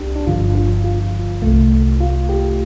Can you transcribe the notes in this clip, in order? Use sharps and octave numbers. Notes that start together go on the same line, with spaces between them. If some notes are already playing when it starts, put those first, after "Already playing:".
Already playing: C2 D4 G4
D4
G1 G2 D3 F3 F4
F4
F4
C2 C3 A3
F4
G4